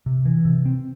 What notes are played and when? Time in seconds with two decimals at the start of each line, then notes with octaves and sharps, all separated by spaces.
0.06 C3
0.25 E3
0.45 C3
0.65 C4